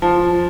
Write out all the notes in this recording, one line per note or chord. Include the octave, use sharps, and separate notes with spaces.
F3